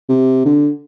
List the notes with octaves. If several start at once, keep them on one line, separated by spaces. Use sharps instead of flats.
C3
D3